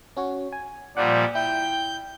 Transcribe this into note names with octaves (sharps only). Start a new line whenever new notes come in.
C#4 F#4 C#5
G#5
A#2 F3 G3 D5 F#5
E4 G5 G6